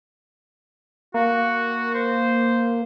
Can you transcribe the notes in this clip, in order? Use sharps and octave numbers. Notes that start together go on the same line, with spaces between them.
A#3 F#4
C5